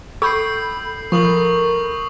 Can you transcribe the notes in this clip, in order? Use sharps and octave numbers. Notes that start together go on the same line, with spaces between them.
A4 B5 C#6 E6 G6 C7
F3 A#4 C#6 D#6 F#7